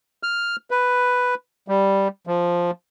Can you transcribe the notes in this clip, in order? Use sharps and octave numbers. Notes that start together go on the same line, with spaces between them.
F6
B4
G3
F3